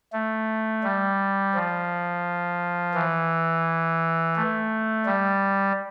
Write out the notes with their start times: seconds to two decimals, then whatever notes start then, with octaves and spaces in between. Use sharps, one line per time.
0.12 A3
0.84 G3
1.54 F3
2.94 E3
4.36 A3
5.06 G3